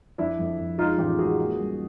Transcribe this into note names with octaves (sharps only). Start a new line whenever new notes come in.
F2 D4 E4
F2
F2
G#3 D#4 F4
A1 F4 G4
G#3 F#4 G#4
A#3
G3